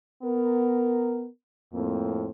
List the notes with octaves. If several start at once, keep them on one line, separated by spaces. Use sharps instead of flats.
B3 A#4
F2 A2 A#3 C4